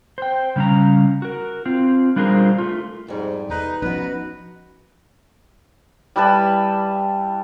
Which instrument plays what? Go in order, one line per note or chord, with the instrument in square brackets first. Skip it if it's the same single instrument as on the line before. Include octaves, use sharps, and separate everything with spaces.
[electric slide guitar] C5 G5
C#3 G3 C#4 F5 A#5
F#4 A#4
C4 F4
G3 D4 F4 G#4 A#4 C5
A3 F4
[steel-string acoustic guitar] F2 G3 [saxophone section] G#2
[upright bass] E2 [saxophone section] D#4 B4
[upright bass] F3 C#4 [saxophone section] B3 B4 [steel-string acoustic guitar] D#4 F#4
[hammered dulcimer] G3 E4 B4 A5